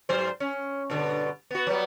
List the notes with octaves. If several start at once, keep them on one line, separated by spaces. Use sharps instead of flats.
G#2 F#3 C5
C#4
G2 B2 D3
B3 F#4
F#3 G3 B3